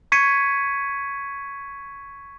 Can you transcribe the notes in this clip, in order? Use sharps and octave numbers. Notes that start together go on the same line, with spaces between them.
C#6 G#6 B6 C#7 D#7